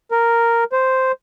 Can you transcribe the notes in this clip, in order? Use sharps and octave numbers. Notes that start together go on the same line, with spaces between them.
A#4
C5